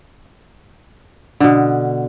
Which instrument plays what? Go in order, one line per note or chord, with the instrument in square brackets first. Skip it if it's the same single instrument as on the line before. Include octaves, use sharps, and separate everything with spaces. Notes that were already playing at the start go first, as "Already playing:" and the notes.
[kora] B2 D3